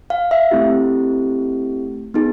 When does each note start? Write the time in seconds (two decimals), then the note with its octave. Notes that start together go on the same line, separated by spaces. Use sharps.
0.10 F5
0.31 E5
0.51 A3 C4 E4 G4
2.14 B3 D#4 G#4